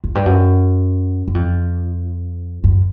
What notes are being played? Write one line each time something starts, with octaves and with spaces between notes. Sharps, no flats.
F#2
G2
F#2
F#2
F2
F#2